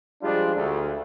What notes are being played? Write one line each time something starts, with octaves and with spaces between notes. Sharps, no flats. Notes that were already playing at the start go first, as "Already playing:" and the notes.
F3 G3 G#3 D4 F4 G#4
D2